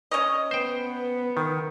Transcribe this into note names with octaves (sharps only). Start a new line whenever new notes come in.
C#4 C#5 D#5
B3 B4 C5 G5
D#3 A#4